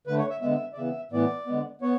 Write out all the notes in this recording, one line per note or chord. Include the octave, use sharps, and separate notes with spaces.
D3 A3 B4
C#5
E5
D3 G#3 B3 E5
D5
C#3 E3 B3 E5
A2 E3 B3 D5
D3 G#3 B3
B3 C#5